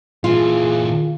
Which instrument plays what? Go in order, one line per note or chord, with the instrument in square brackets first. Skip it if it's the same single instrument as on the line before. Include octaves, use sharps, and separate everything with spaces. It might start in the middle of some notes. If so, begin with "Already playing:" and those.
[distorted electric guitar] A#2 E3 [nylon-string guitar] F4 [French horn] G#4